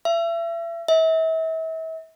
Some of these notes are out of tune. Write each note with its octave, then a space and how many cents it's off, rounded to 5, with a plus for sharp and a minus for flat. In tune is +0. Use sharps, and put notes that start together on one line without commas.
E5 +35
E5 -35